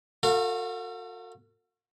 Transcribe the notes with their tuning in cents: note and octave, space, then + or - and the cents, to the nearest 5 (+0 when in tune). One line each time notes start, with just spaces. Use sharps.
F#4 -30 A4 +40 F5 +0